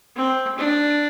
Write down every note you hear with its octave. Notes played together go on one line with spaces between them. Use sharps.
C4
D4